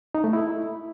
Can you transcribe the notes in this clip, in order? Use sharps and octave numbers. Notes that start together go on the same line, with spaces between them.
D#4
A3
E4